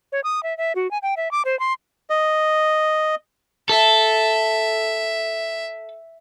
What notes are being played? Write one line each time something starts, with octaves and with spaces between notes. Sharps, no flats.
C#5
D#6
E5
E5
F#4
G#5
G5
E5
D6
C5
C6
D#5
A4 E5